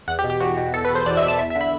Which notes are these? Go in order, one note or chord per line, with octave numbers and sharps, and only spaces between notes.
E2 F#5
G4
B2
G4
E2 F#4
B2
E2 A4
B4
B2 C5
E2 D5
E5
B2
A5
E2 E5
E5
D3
B5